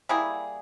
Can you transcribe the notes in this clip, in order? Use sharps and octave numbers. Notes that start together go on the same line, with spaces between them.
G3 A#3 E4 G#4